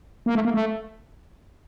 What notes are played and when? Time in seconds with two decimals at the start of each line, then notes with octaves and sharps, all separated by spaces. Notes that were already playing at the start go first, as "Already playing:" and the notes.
0.26 A#3
0.35 A3
0.45 A#3
0.54 A3